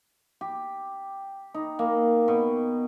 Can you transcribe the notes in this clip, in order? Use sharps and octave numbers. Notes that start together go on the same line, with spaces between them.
G4
D#4
A#3
B2